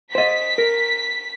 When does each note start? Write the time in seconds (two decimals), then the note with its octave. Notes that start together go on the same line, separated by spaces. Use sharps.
0.15 C5 D#5 B6
0.58 A#4